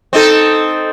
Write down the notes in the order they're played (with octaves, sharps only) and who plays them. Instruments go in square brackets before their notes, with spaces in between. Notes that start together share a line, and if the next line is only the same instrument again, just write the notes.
[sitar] C4 D#4 A4